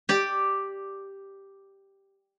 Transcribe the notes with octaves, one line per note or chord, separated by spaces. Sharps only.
G4 D5